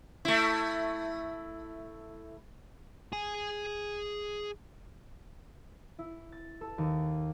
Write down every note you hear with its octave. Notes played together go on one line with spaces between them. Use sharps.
A3 E4
G#4 G#5
E4
A6
A4
D#2